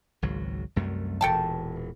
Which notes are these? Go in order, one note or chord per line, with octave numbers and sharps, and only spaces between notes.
G#1 C#2 F#3
C2 F#2 A3
E1 A#2 E3 A4 G5 A5